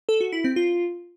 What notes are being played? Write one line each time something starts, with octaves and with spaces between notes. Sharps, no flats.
A4
F#4
E4
C4
F4